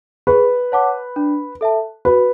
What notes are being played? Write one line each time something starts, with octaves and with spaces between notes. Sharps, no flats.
G#4 B4
C#5 F#5 A5 D6
D4
A4 E5 A5
F#4 B4